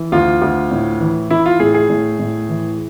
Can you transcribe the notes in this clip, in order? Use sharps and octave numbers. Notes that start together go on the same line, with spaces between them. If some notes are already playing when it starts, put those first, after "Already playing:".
Already playing: E3
D2 F4
D2
A2
E3
E3 E4
F4
A2 G#4
G#4
A2
A2
E3